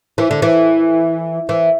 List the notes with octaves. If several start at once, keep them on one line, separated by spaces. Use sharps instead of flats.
E3
D3
E3
E3